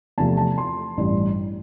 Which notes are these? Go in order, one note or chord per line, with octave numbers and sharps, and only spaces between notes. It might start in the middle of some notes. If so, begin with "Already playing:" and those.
E2 C3 F3 A3 A5
A5
C6
A1 G2 E3 G3